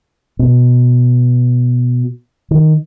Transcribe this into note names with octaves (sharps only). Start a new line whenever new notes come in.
B2
D#3